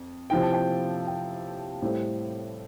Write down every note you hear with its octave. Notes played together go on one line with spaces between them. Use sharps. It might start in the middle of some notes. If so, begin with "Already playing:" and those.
Already playing: F2
C3 F3 C4 E4 G5
A5
G5
G5
A2 G3 C4 E4